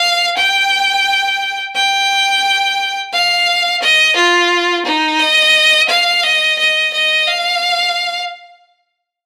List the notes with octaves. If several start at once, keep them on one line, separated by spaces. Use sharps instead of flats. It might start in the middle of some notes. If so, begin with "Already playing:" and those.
Already playing: F5
G5
G5
F5
D#5
F4
D#4
D#5
F5
D#5
D#5
D#5
F5